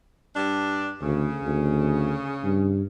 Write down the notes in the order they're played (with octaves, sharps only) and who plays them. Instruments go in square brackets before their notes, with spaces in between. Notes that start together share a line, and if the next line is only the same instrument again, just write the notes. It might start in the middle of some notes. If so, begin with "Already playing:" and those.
[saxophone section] G2 D4
[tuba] D2 [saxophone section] C#3
[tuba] D2
G2